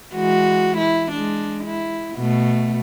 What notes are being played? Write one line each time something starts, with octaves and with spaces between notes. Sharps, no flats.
E3 G#3 F#4
E4
G#3 D4
E4
B2 A3